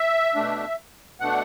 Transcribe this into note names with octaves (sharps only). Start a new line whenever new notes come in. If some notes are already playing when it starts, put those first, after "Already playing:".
Already playing: E5
B2 A3 D4
B2 A3 D4 F#5